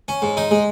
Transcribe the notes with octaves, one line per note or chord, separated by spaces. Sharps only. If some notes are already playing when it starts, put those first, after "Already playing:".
C#4
G#2
D#4
G#3